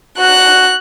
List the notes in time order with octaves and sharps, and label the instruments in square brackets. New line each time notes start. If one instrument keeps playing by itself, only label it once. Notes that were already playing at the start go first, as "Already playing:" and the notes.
[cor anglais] F#4 [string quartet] F#6